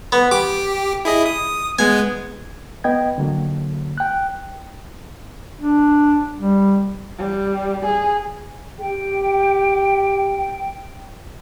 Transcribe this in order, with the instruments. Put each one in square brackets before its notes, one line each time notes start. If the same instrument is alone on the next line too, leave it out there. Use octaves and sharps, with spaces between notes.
[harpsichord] B3
[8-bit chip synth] G4 [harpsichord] D6
[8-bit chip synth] E4 G#4 D#5
D#6
[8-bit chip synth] G#3 B3 [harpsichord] G#5
[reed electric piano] B3 D#5 G5 G#6
D3 F#3 A#3
G5 F#6
[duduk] D4
G3
[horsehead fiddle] G3
G#4
[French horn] G4 [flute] G5